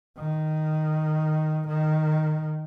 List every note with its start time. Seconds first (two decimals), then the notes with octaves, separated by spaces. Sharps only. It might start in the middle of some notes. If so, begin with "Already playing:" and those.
0.18 D#3
1.67 D#3